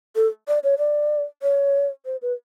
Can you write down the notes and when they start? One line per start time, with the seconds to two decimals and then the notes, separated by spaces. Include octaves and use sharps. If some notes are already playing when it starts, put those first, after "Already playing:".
0.16 A4
0.48 D5
0.64 C#5
0.78 D5
1.43 C#5
2.05 C5
2.22 B4